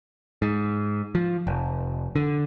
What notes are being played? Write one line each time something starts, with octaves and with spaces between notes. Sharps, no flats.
G#2
F3
F1
D3